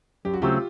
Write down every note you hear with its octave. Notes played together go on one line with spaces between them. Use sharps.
F#2 G4
F#4
C#3 F#3 A3 C4 F4 G4